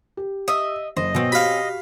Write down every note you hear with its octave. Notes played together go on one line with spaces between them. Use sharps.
G4
D#5 E5
F#1 C5 D#5
B2 C4 C#4
F#4 G4 F5 B5